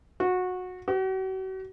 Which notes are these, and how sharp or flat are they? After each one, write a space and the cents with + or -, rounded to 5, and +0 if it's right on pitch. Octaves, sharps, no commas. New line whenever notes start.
F#4 -20
F#4 +40